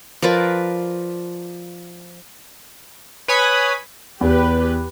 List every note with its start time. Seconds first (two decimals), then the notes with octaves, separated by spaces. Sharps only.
0.22 F3 A#4 B4 D5
3.28 B4 C#5 G#5 B5 D#6
4.21 E2 G4 B4